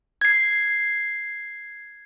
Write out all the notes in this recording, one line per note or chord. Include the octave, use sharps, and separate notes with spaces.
G#6 C7